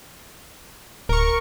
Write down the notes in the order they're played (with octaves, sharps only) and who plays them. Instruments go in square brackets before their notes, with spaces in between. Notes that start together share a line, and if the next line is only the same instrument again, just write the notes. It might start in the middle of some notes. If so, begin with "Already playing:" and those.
[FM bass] D1 [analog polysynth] A#4 C#6